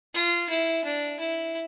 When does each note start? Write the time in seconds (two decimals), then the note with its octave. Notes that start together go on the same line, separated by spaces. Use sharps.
0.14 F4
0.49 E4
0.85 D4
1.19 E4